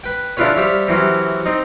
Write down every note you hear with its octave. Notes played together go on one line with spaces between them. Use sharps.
B4 G5
C#3 D4 E4 F4 B4 C#5
G3 G4 C5 C#5 E5 F5
C3 E3 F#3 C#4
C4 D#4